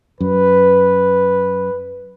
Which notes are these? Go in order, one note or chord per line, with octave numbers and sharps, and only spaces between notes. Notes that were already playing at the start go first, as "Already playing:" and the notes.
F#2 B4